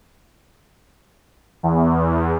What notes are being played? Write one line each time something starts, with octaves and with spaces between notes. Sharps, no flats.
E2